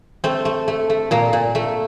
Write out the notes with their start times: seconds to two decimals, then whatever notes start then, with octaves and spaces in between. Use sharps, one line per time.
0.24 A3 C4
0.45 A3
0.68 A3
0.90 A3
1.11 A#2 A#3
1.33 A#2
1.55 A3